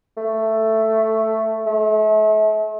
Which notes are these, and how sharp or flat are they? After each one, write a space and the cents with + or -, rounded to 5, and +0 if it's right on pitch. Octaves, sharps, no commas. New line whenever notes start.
A3 +5
A3 -40